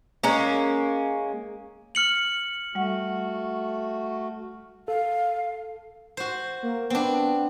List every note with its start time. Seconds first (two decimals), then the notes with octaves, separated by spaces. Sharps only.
0.23 G#3 A#3 C#4
1.95 F6 C#7 F#7
2.75 G3 A3 F#4 F#5
4.88 A4 F5
6.17 F#4 C5
6.63 A#3
6.90 B3 C4 D4